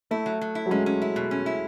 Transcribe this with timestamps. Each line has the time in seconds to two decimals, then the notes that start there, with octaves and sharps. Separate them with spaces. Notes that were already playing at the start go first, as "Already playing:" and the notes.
0.11 A3 E4
0.26 F#3
0.41 F#3
0.55 E4
0.66 F#3
0.71 G#3 C#4
0.86 C#4
1.02 E4
1.16 B2
1.31 C#4
1.46 E4